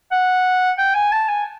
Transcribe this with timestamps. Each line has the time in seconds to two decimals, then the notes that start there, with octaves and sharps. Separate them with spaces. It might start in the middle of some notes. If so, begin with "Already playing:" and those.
0.11 F#5
0.78 G5
0.95 G#5
1.12 A5
1.28 G#5